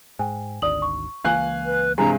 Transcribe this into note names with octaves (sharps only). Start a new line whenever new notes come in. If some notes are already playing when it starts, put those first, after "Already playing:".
G#2 G5 G#5
G#1 D2 D5 D#6 F#7
C#6
C#2 E3 A#3 F5 G#5 F#6
B4
G2 C3 E3 F3 G#3 G#5 A#5